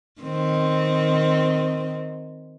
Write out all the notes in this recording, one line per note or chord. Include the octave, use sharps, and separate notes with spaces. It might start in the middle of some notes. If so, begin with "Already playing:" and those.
D#3 C4